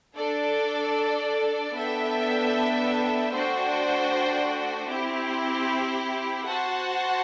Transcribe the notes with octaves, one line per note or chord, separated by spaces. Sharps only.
D4 A4 D5
B3 D4 A4 E5 G5
A3 D4 F#4 C5 G5
C4 E4 G4
F#4 C5 F#5 A5